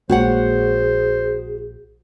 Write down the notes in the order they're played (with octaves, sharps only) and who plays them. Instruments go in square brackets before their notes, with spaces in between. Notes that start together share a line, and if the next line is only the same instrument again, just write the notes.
[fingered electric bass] A#1 G#3 A#3 [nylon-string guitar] F#4 C#5 F#5 [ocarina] G#4 [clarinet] C5